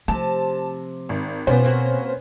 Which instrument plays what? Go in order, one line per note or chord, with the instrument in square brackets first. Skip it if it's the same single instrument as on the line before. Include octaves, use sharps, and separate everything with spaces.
[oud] C3 [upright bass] F3 A3 [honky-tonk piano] A5
[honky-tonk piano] G#1
[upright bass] B2 [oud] F3 G3 [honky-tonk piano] B3 C#4 C5
[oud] A#3 C4 F#4